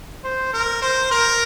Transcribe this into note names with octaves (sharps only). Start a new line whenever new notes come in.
C5
A#4
C5
A#4